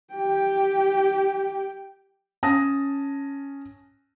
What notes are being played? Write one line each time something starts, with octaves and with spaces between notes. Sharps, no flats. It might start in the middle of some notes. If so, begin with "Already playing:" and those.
G4 G5
C#4 A5 D#6 A#6